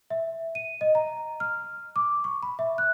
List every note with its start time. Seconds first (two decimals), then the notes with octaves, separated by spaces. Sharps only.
0.10 E5
0.55 D#7
0.81 D#5
0.95 A#5
1.40 F6
1.96 D6
2.24 C#6
2.43 B5
2.59 E5
2.78 F#6